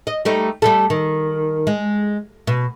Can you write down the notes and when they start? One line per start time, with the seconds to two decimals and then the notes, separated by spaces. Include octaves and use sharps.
0.07 D#5
0.25 G3 A3 D#4
0.62 G3 A3 A4
0.90 D#3
1.67 G#3
2.47 B2